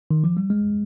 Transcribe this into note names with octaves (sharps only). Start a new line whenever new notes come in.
D#3
F3
G3
G#3